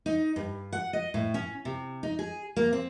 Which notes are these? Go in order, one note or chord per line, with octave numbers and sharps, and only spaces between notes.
D#4
G2
F#5
D#5
A2
C#4
C3
D#4
G#4
A#3
C4